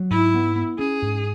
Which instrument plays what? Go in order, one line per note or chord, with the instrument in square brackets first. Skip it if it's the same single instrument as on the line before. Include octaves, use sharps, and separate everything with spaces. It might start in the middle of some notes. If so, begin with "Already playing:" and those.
Already playing: [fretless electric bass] F#3
[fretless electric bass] G#2 [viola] E4
[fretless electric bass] B3
B3
[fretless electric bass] C#4 [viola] G#4
[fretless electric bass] G#2